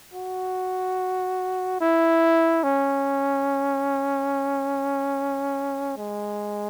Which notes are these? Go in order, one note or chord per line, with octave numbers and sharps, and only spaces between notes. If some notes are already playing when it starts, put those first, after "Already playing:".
F#4
E4
C#4
G#3